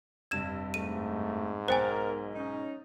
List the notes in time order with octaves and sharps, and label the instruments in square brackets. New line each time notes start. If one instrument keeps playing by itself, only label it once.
[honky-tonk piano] F1 G2 E6 [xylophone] G#6 E7
[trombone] G#2 [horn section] A3 [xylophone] D#7
[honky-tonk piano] B1 A6 [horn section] A#4 [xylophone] C5 G5 G#5
[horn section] C#4 D#4